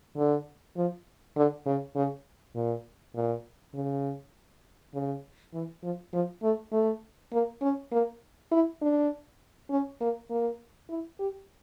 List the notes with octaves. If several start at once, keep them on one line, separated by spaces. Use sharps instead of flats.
D3
F3
D3
C#3
C#3
A#2
A#2
C#3
C#3
E3
F3
F3
A3
A3
A#3
C#4
A#3
E4
D4
C#4
A#3
A#3
E4
G4